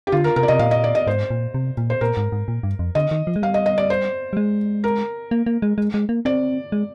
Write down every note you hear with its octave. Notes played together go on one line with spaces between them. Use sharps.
G4
D3 F4
A#4
C3 A#4
D5
C3 D#5
A#2 F5
D#5
D5
D#5
G#2 C5
A#2
C3
A#2
C5
A#2 A#4
G#2
G#2
A#2
G2
F2
D3 D#5
D#3
F3
G#3
G3 F5
D#5
D#5
D5
C5
G3
G#3
A#4
A#3
A#3
G#3
G#3
G#3
A#3
C4 D5
G#3